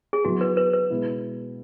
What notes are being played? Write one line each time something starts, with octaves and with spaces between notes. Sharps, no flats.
G#4
F#3 B3 E4 F#4
B4
B4
B4
B2 G#3 E4